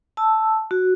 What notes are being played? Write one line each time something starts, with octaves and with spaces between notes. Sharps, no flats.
A5 E6
F#4